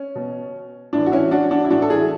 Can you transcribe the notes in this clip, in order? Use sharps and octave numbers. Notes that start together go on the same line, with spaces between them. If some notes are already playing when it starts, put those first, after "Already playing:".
Already playing: C#4
B2
A2 E3 D4
F#4
C#4 E4
D4 F#4
D4 F#4
E4
A2 E3 D4 F#4
A4
E4 G#4